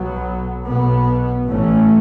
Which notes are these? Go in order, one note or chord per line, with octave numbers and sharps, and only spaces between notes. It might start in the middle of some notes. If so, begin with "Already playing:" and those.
Already playing: B1 B2 F#3 B3
B1 B2 B3
A1 A2 E3 A3 C#4